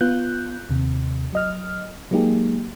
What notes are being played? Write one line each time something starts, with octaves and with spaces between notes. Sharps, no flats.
B3 F4 F#6 G6
D#2 C3
F#3 D#5 F6
F#3 G#3 A#3 D#4 G4 G#4